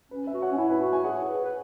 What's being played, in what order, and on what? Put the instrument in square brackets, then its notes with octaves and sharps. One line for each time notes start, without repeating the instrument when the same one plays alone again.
[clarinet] C#4 [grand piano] B4
[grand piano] B4 E5
[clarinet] F#4
[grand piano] C#5 F#5
[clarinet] C#4
[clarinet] E4 [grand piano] E5 G#5
[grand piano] B4 E5
[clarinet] F#4
[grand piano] E5 G#5
[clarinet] G#4 [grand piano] C#5 F#5
[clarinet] B4
B4